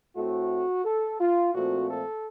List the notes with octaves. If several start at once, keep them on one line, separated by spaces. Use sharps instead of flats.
A2 A3 C4 F#4
A4
F4
A#2 F3 A3 C4 F#4
A4